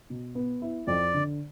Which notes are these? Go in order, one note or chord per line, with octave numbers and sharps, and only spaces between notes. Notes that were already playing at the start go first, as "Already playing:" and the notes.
B2
B3
E4
F2 D5
D3